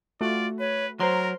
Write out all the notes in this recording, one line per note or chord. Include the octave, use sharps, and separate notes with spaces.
A3 F4 F#4 D5
B4 C#5
F#3 A#4 C5 A#5 C6